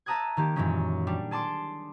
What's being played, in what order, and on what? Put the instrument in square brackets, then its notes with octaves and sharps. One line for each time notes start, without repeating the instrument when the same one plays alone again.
[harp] E5 A5 A#5 D#6 F#6 G#6
D#3 A#3 G4
F#2 A#2 D#3 E3 G#3 C#4
G3 D4
G#4 A5 C6 D6